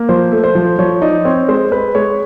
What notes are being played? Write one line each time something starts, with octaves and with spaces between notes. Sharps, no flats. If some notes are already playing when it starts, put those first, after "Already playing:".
Already playing: A#3
F3 C5
A3
C5
F3
F3 C#5
D#4 D5
C4 C#5
G#3 C5
G#3 B4
G#3 C#5